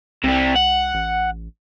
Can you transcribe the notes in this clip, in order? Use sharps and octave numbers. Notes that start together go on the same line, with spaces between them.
C2 C3 G3
F#5
A1